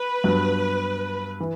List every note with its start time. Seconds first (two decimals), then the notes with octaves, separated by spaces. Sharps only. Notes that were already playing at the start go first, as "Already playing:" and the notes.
Already playing: B4
0.24 G2 F#3 B3
1.40 E3